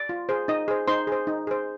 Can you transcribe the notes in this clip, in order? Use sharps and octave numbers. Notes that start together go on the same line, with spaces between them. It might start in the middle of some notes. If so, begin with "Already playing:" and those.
Already playing: D5
F4
G#4 C5
D#4 D#5
G#4 C5
D#4 C5 C6
G#4 C5
D#4
G#4 C5